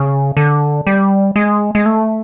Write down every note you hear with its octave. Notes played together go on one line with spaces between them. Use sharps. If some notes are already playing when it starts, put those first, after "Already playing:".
Already playing: C#3
D3
G3
G#3
G#3
A3